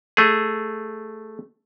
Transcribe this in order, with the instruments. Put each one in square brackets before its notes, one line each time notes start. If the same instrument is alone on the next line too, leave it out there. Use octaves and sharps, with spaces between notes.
[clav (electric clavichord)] A3 G#4